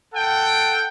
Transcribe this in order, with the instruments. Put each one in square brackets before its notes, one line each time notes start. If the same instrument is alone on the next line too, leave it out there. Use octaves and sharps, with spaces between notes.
[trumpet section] A4 F#5 G5